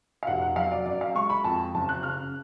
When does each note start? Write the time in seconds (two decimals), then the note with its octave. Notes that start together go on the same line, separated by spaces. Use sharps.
0.23 F5
0.27 F1 F#5
0.42 F#5
0.56 F#3 F5
0.71 D5
0.86 F#2 D5
1.01 F5
1.15 G#3 C#6
1.30 B5
1.44 F2 A5
1.74 F#1 A5
1.89 F#6
2.03 C#3 F6